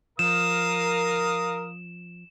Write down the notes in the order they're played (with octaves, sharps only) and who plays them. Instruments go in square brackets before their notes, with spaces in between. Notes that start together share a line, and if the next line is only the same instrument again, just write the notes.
[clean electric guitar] F3 [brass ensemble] A#4 [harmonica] F5 D#6 [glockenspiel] E7